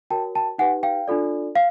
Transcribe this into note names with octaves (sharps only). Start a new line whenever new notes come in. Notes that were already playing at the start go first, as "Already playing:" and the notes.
F#4 A#4 C#5 G5 A5
G5 A5
D#4 G4 B4 F#5 G#5
F5 G5
D4 F4 A4 D5
F5